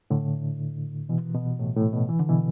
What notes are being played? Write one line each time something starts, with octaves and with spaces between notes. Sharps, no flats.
A2 D3
B2 E3
B2
A2
A2
B2
E3
D3
B2 E3